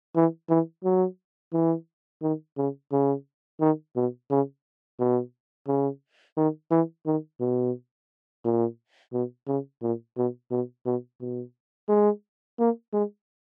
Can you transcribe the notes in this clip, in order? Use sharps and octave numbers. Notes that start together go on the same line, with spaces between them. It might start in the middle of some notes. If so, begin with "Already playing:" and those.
E3
E3
F#3
E3
D#3
C#3
C#3
D#3
B2
C#3
B2
C#3
D#3
E3
D#3
B2
A#2
B2
C#3
A#2
B2
B2
B2
B2
G#3
A#3
G#3